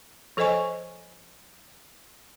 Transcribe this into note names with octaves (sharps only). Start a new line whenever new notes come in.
F3 A4 C5 D#5 G#5 C#6